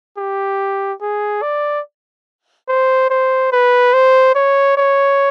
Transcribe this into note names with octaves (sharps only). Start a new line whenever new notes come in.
G4
G#4
D5
C5
C5
B4
C5
C#5
C#5